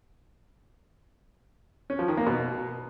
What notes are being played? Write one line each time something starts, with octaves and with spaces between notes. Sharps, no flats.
C#4
F3
D#3
A#3
B2